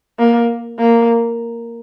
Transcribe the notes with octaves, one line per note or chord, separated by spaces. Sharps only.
A#3
A#3